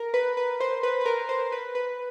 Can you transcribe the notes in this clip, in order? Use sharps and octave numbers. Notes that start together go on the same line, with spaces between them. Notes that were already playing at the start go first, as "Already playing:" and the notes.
Already playing: A#4
B4
B4
C5
B4
B4
A#4
C5
B4
B4